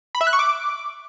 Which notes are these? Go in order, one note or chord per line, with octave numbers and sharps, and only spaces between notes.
B5
E5
F#6
C#6
D6